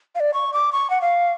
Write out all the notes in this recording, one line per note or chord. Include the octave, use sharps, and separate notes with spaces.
F5
D5
C#6
D6
C#6
F#5
F5